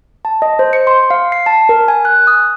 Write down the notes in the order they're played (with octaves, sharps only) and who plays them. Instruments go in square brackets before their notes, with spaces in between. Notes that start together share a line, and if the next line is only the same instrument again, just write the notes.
[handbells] A5
D#5
C5
C#7
C6
F5
C7
A5
A#4
G#5
F#6
D#6